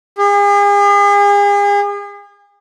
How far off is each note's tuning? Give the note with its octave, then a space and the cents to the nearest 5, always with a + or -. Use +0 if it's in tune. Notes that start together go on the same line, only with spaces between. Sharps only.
G#4 -40